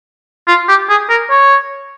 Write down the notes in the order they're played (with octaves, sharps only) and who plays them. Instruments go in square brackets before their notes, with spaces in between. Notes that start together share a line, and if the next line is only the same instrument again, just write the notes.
[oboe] F4
G4
G#4
A#4
C#5